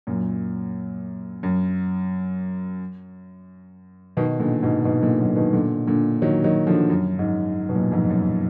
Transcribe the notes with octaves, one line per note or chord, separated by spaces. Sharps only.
F#2 A#2
F#2
B2 D#3
A#2 D3
G#2 B2
G#2 B2
A#2 D3
F#2 A#2
D3
B2 D#3
A#2 D3
A#2 D3
D#3 F#3
D#3 F#3
D3 F3
F#2
G#2
F#2
B2
F#2 A#2
F2 G#2
F#2